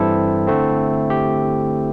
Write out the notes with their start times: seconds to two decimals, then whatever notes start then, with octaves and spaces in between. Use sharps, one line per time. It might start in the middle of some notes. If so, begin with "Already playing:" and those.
Already playing: G2 E3 G3 C4 E4 G4 A4 C5
0.47 D3 A3 C4
1.10 G4